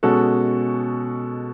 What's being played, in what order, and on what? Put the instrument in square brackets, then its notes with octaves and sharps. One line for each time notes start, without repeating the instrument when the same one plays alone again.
[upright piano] B2 G#3 C#4 F#4 A4